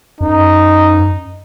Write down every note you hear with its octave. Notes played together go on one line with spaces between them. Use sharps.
F#2 D#4